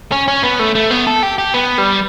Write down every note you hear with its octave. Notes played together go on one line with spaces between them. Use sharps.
C#4
C#4
B3
A3
A3
B3
A4
G4
G4
B3
G3